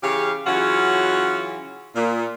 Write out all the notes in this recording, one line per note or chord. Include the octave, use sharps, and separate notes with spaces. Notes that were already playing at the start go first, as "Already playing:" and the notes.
C#3 E3 G4 C#5 F5
C#3 E3 F#3 C#4 F4 F#4
A#2